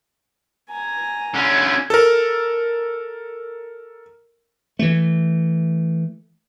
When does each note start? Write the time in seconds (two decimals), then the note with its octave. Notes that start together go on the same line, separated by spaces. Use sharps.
0.71 G#5 A#5
1.34 D3 C#4
1.90 A4 A#4
4.79 E3 A3